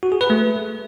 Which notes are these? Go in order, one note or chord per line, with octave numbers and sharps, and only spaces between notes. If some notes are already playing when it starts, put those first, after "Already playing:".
F#4
G#4
B4
A3